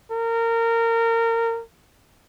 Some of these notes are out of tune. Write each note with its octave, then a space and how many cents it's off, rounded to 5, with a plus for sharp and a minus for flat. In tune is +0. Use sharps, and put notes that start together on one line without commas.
A#4 -25